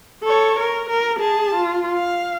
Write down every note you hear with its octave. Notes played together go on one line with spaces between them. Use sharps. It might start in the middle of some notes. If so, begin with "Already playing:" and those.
A4 C#5
A#4
A#4
G#4 A5
F4
F5